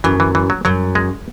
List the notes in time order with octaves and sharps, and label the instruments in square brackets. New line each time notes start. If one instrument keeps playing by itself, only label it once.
[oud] F#2 [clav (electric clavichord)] E3
[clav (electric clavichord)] E3
E3
F#3
[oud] F#2 [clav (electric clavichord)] F#3
[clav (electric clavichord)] G#3